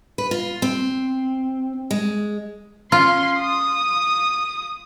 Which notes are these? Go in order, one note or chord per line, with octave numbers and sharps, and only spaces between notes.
B4
F4
C4
G#3
C#4 F4 C6
D#6